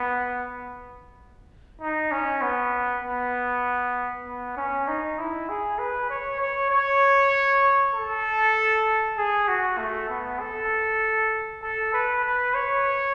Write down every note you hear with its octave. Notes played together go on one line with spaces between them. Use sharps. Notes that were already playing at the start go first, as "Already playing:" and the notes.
Already playing: B3
D#4
C#4
B3
B3
B3
C#4
D#4
E4
G#4
B4
C#5
C#5
C#5
A4
G#4
F#4
A3
B3
A4
A4
B4
B4
C#5